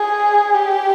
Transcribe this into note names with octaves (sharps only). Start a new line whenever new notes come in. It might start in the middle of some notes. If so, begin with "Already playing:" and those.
Already playing: G#4
G4